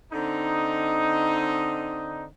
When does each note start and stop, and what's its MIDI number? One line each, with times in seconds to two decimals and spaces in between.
0.12 2.26 50
0.12 2.26 60
0.12 2.26 63